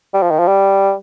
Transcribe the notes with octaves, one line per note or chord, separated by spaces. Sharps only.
G3
F3
D#3
F3
G3